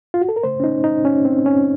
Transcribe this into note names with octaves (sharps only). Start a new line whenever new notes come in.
F4
F#4
A4
A#4
C#3 A3 C5
C#4
D#4
D#4
C#4
C4
C#4